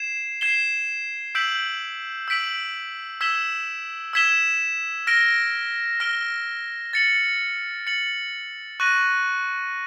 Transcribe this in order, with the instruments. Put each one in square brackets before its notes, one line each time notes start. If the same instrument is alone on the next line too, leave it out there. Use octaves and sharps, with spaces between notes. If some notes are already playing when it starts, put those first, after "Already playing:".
Already playing: [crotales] G#6 C7 E7
G#6 C7 E7 G7
E6 G6 B6 D7 F#7
E6 G6 B6 D7 F#7
E6 G#6 B6 E7 G7
E6 G#6 B6 E7 G7
F6 A#6 D7 G7
F6 A#6 D7 G7
A6 C#7 F#7
A6 C#7 F#7
C#6 F#6 A#6 D#7 F#7